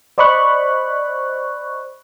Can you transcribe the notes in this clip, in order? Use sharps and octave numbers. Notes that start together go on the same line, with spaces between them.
C5 D5 D#5 B5 C#6 F#6